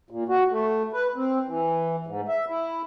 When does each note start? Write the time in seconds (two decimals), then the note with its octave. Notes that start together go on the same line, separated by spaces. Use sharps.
0.10 A#2
0.29 F#4
0.51 A3
0.93 B4
1.16 C4
1.47 E3
2.06 G#2
2.28 E5
2.49 E4